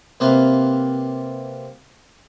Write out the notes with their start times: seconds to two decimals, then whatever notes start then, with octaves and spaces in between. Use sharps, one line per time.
0.20 C3 A#3 F4 G4 B4